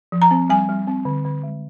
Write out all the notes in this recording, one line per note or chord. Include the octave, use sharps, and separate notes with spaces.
F3
A#5
C4
G3 G#5
G3
C4
D3
D3
G#3